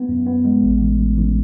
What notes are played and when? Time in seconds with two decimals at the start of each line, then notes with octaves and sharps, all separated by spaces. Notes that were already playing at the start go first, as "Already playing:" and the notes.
Already playing: B3
0.09 F#2
0.26 B3
0.45 G#3
0.62 A1
0.81 A1
0.98 A1
1.17 A1